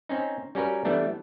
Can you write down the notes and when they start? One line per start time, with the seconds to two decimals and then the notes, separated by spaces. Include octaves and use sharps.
0.09 C4 C#4 D#4
0.55 G3 C#4 F#4 A#4 B4
0.85 E3 G3 A3 B3 D4